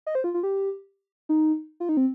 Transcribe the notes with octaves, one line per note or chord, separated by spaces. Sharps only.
D#5
C5
F4
F4
G4
D#4
F4
D#4
C4